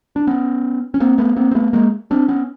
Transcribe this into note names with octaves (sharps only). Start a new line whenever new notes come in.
D4
B3 C#4
C#4
A#3 C4
A3 B3
A#3 C4
C4
A3 B3
G#3 A#3
C4 D4
B3 C#4